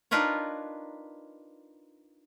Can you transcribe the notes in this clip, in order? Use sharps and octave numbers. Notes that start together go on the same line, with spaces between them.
D4 D#4 F4 A#4 B4 C#5